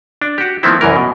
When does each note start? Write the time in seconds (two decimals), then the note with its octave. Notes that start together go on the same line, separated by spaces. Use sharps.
0.22 D4
0.38 F#4 G4
0.63 D#3 F3 A3 B3 C4 E4
0.81 C2 F#2 E3 A#4
0.96 B2